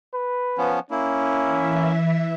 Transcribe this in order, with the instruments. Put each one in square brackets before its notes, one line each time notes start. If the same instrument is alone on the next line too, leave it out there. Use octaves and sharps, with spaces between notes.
[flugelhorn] B4
[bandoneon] F3 B3 C#4
[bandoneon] A#3 E4 [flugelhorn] C#4
[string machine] E3 E5